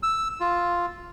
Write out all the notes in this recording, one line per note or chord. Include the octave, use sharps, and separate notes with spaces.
E6
F4